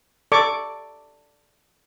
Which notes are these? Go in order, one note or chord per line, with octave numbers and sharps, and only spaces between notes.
A4 D5 C#6 D6